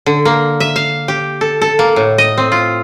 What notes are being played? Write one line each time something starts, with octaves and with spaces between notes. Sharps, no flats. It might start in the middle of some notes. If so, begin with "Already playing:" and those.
D3
A#3
E5
F5
G4
A4
A4
A#3
A2
D#5
C4
F4